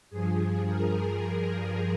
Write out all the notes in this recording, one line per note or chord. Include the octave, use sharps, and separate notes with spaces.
G2 F3 G#4
A#4